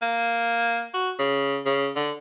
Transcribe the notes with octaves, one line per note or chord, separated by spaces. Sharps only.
A#3
F#4
C#3
C#3
D3